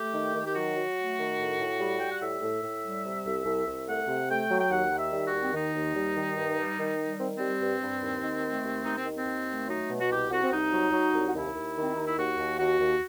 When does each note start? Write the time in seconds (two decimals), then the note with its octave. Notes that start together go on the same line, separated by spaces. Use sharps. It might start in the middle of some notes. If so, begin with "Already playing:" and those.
Already playing: A3 G4
0.14 D#3
0.34 D#3
0.44 G4
0.55 F#3 F#4
0.76 F#3
0.96 A3
1.17 D#3
1.39 A2
1.60 A2
1.79 G3
1.98 G3 G5
2.10 F#5
2.21 A2 E5
2.41 A2
2.63 A2
2.83 G3
3.04 C3
3.26 C2
3.45 C2
3.66 C2
3.87 A3 F#5
4.07 C3
4.29 A3 G5
4.50 F#3
4.59 G5
4.70 D#2 F#5
4.90 D#3
4.97 E5
5.12 G3
5.25 F#4
5.32 D#2
5.42 C4
5.53 D#3 D#4
5.75 D#2
5.94 G3
6.15 D#3
6.36 G2
6.57 G3
6.78 D#3
6.98 G3
7.20 D#3 C4
7.35 G3 C4
7.61 G2
7.82 G2
8.02 D#2
8.22 D#3
8.44 A3
8.64 D#2
8.85 D#2 D#4
8.95 C4
9.06 D#3
9.16 C4
9.26 D#2
9.48 A3
9.68 F#3 D#4
9.89 B2
9.99 F#4
10.10 C2 G4
10.30 C2 F#4
10.43 C4
10.51 C2 D#4
10.72 F#3
10.92 F#3
11.13 C2
11.29 F#4
11.34 D#2 E4
11.55 D#2
11.76 D#3
11.81 C4
11.94 D#2 D#4
12.05 E4
12.17 D#2 F#4
12.38 D#2
12.58 D#2 F#4
12.80 D#2